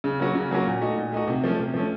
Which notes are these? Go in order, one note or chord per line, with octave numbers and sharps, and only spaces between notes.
C#3
F#3 A#3 C#4 F#4
C#3
F#3 A#3 C#4 F#4
A#2
A3 D#4 F#4
A#2
A3 D#4 F#4
C3
F3 A3 C#4
C3
F3 A3 C#4